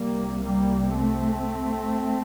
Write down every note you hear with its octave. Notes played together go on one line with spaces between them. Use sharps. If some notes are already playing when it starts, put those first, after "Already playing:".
Already playing: C2 C3 G3 A#3
G3 A#3
A3 C4